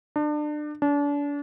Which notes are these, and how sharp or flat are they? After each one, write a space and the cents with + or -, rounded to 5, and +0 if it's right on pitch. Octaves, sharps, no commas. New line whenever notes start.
D4 +30
D4 -35